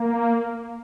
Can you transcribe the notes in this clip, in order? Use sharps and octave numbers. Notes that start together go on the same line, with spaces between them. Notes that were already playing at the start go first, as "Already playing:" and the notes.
Already playing: A#3